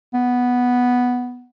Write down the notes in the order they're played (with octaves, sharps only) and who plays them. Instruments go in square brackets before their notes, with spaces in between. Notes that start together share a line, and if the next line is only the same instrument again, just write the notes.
[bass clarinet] B3